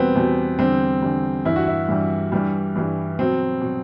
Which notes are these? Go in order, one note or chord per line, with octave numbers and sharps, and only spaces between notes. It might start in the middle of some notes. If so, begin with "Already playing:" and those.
Already playing: E2 B2 G3 B3 C4
E2 B2 G3
E2 D3 G3 C4
E2 D3 G3
G2 E3 G3 E4
F#4
E4
G2 E3 G3
G2 E3 G3
G2 E3 G3
B2 F#3 C4
B2 F#3